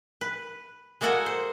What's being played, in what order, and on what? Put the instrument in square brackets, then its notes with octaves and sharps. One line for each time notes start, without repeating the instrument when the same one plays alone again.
[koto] B4
G#3 A#3 F#4 A4 F#5 G#5
C5